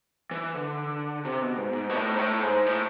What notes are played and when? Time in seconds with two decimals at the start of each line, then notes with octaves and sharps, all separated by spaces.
0.31 E3
0.55 D3
1.25 C3
1.41 B2
1.57 G#2
1.73 G#2
1.89 B2
1.96 A2
2.15 G#2
2.19 A2
2.42 G#2
2.66 A2